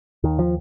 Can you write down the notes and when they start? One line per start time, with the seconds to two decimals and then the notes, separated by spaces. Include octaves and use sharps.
0.24 D#2 D#3
0.39 F3